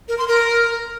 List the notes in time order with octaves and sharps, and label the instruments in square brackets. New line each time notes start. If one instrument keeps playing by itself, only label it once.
[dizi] A#4
C6
A#4